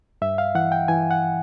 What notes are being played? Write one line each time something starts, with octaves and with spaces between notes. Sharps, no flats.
G2 E5
F5
E3 F#5
G5
E3 G#5
F#5